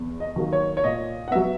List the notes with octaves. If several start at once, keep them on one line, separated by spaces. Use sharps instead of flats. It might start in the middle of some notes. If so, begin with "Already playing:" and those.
Already playing: E2
D#5
D#3 F#3 A#3
C#5
C#5
A#2 D#5
F#5
F#3 B3 E5